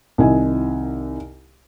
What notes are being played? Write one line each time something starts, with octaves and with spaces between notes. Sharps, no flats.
C2 D#3 E4 D#5 G#5